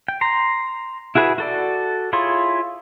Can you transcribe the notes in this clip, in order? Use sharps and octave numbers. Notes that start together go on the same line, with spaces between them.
G5
A#5 C6
E4 F#4 G#4 B4 E5
F#4 A4 D5
E4 F4 G#4 C#5 C6